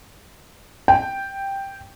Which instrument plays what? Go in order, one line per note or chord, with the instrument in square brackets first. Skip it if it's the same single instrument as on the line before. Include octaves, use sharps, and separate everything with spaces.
[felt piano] G5